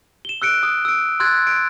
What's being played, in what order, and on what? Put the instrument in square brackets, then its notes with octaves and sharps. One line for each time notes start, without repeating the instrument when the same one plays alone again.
[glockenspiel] E7 G7
E6 F#6 C#7 D7
D#6
E6 D7
C6 E6 F#6 G#6 A6
D7